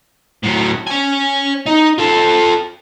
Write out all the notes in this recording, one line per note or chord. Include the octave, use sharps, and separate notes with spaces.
A2 F#3
C#5 G#5
D#4
F4 A4